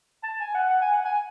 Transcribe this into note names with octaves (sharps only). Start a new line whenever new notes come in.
A5
G#5
F#5
F#5
G#5
F#5
G#5